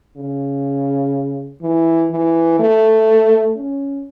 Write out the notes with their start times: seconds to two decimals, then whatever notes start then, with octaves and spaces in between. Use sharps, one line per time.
0.17 C#3
1.62 E3
2.11 E3
2.59 A3
3.57 C#4